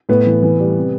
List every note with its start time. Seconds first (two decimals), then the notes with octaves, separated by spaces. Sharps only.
0.09 A2 B3
0.26 E3
0.43 E3
0.59 G3
0.76 C3